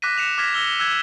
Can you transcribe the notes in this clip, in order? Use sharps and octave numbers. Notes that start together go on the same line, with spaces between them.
D6 F#6 A#6 B6 D#7
C#7 E7 F7
D6 F6 G#6 A#6 B6
E6 A#6 G7
E6 F#6 G#6